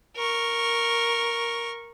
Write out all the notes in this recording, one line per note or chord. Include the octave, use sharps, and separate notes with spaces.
A#4 C#6